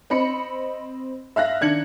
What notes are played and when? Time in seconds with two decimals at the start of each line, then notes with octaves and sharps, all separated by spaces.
0.10 C4 D#5 B5 C#7
1.36 E5 F5 F#6 A#6
1.61 D#3 D4 G#6 C#7 F#7